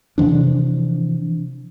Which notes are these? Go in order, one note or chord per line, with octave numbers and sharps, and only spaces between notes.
C3 E3 F3 D4